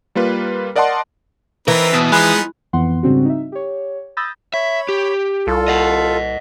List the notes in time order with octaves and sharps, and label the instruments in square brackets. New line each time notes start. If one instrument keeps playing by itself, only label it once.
[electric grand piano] G3 A#3 F4 B4
A#4 D5 D#5 F#5 A5 C6
[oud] E3 [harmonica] C4 D#4 B4 [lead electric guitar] A#4
[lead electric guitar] B2
[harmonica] F3 B3 D#4 [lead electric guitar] G#3 [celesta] G#5 B5 F#6
[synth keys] F2 E3 B3 F#5 C6
G#2 C#3 G3 C4 D4 F#4
D#4 E5
G4 C#5
B5 D#6 E6 G6 A6 A#6
[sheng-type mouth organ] C#5 B5 [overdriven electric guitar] E5
[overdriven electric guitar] G4
[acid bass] C2 [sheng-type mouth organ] F4 A4
[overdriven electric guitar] D#5 F#5